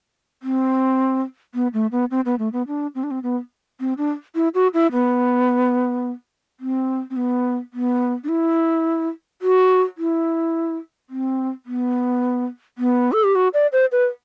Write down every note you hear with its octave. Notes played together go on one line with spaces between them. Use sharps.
C4
B3
A3
B3
C4
B3
A3
B3
D4
C4
D4
C4
B3
C4
D4
E4
F#4
E4
B3
C4
C4
B3
B3
D4
E4
F#4
E4
C4
B3
B3
A4
G4
F#4
D5
C5
B4